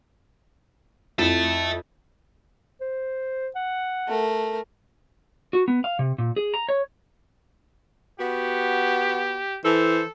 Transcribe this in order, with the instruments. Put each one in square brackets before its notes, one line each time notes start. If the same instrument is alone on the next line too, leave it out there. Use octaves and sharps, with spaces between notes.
[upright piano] F2 E4 [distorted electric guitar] E5 A5
[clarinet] C5
F#5
[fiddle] A3 A#4
[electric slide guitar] F#4
B3
F5
C3
A#2
G#4
A#5
C#5
[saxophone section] B3 F#4 [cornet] G4
[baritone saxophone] E3 [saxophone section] A4 [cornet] C5